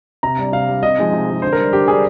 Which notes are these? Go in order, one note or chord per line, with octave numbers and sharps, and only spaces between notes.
C3 A#5
G3 D4
C3 F5
G3 D4
C3 D#5
F3 G#3 D#4
C3
F3 G#3 D#4
D3 C5
A#4
G3 D4
D3 G4
G3 D4 G#4